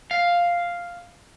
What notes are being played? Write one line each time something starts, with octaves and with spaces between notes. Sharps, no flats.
F5